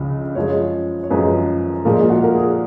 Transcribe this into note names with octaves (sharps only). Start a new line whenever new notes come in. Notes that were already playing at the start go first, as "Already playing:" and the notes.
Already playing: C#2 C#3 F3
F#2 F3 G#3 C#5
C#5
F#2 F3 G#3 B4
A#2 F3 G#3 A#4
F4
F#4
A#4
G#4